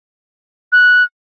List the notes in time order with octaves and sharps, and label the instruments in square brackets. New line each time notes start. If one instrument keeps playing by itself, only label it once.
[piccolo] F#6